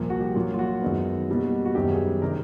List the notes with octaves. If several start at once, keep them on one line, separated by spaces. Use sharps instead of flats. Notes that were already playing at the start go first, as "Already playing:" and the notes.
Already playing: C2 A#2 F3 A#3 A#4
F#4
G4
A#2 F#3 A#3 F4
F4
F#4
F#2 D#3 G#3 B3
B2 G3 A#3
F#4
F#2 D#3 G3 B3 G4
G#4
C3 D#3 A#4